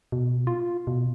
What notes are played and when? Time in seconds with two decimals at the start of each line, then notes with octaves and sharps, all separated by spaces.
0.12 B2
0.47 F4
0.87 B2